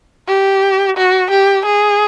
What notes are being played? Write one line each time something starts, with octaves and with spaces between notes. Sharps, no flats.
G4
F#4
G4
G#4